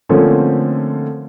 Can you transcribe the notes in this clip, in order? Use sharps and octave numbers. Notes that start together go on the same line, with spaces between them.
D3 F3 A3 A#3 C4 C#4